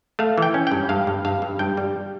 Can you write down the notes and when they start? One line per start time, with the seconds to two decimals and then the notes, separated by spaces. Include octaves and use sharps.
0.19 A3 F5
0.38 E3 G5
0.54 C#4
0.67 G2 G5
0.89 G2 F5
1.07 G2
1.25 G2 F5
1.42 G2
1.59 G2 G5
1.77 G3